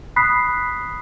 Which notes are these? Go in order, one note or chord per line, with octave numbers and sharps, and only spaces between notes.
B5 D#6 F#6 B6 C7